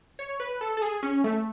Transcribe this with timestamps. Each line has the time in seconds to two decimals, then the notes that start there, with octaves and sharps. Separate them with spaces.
0.19 C#5
0.40 B4
0.61 A4
0.77 A4
0.82 G#4
1.03 C#4
1.24 A3